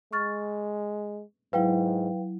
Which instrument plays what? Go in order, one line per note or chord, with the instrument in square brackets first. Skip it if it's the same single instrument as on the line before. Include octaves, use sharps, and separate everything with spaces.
[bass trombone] G#3 [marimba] C#6 F6 A6
[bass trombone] G#2 [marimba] F#3 E4 [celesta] B4 F5 G5